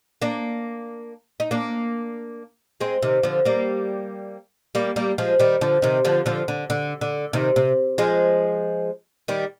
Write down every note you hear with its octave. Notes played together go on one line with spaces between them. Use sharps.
A#3 D4
D#4
A#3 D4
G#3 C4
C3 D#3
D3 F3
G3 A#3
G3 A#3
G3 A#3
F3 G#3
D#3 G3
D3 F3
C3 D#3
D3 F3
D3 F3
D3
D3
D3
C3 D#3
C3
F3 G#3
D#3 G3